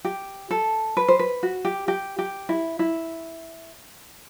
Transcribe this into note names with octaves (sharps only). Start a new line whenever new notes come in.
G4
A4
B4
C5
B4
F#4
G4
G4
G4
E4
E4